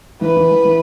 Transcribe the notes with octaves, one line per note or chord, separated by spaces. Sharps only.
E3 B4
E3
E3
E3